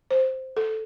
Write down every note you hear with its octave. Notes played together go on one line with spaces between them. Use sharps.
C5
A4